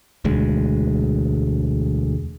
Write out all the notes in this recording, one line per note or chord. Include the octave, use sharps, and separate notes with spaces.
E1 D2 G#3